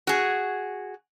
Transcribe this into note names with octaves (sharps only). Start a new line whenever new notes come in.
F#4 G#4